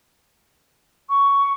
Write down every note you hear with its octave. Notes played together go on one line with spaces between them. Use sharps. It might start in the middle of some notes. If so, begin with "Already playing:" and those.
C#6